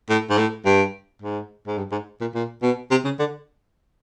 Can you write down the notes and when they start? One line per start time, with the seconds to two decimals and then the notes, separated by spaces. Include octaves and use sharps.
0.09 A2
0.30 G#2
0.38 A2
0.65 G2
1.22 G#2
1.67 G#2
1.78 G2
1.92 G#2
2.21 A#2
2.34 A#2
2.62 B2
2.91 C3
3.04 C#3
3.19 D3